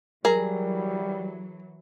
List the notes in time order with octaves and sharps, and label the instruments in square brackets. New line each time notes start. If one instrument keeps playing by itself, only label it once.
[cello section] E3 F#3 [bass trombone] G3 [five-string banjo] G#4 A#5 [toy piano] A#4